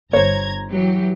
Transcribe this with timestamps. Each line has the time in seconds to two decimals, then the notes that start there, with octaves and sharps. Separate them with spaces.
0.13 G1 C5 C#5 A#5 G#6
0.71 E3 F#3 G4